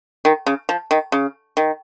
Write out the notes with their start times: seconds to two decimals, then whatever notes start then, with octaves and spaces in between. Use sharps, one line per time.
0.25 D#3
0.46 C#3
0.69 F3
0.91 D#3
1.12 C#3
1.57 D#3